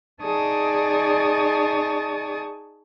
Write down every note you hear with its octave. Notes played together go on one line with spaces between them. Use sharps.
D#4 G#4 D5 A5 C#6 D#6